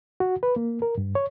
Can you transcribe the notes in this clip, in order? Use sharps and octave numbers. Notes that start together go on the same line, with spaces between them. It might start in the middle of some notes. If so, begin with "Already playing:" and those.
F#4
B4
A#3
A#4
G2
C#5